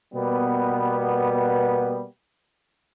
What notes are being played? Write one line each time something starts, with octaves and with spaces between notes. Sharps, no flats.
B2 G3 A#3 B3